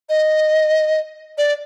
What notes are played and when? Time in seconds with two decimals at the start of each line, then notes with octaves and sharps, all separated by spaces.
0.09 D#5
1.38 D5